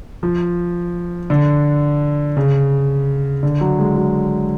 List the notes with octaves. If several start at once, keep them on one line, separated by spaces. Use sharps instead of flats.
F3
D3
C#3
D3
F#3
G#3
F#3